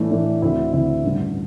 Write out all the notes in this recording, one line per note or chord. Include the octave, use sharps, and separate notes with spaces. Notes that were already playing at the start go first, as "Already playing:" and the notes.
Already playing: A2 E3 A3 D4
A2 E3 A3 D4
D2 D3 C4 E4
D2 D3 C4 E4
A1 G2 D3